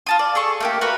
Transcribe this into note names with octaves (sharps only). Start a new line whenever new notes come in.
F4 A5 D#6
D5
G#4 A4 C#6
A3 A#3 G4
F#4 A#4 B4